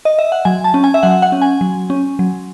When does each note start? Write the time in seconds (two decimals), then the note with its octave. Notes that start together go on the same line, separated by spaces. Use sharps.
0.05 D#5
0.19 E5
0.32 F#5
0.45 F#3 G#5
0.64 A5
0.74 C#4
0.84 G#5
0.94 E5
1.03 F#3 F#5
1.22 F#5
1.32 C#4
1.42 G#5
1.61 F#3
1.90 C#4
2.19 F#3